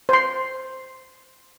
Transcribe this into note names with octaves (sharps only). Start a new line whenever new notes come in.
C5 C6